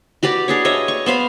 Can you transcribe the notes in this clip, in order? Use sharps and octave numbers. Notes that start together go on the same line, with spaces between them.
F#4 G4 B4 D5
D4 G#4 C#5
C#5 D#5 E5
C#6
B3 C5 F5 B5